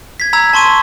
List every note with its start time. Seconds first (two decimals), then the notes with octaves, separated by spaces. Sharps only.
0.20 G#6 B6
0.33 A#5 B5 E6 G#6
0.53 A5 C6 C#6 D#7